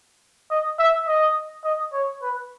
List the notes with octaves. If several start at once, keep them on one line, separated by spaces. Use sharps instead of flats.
D#5
E5
D#5
D#5
C#5
B4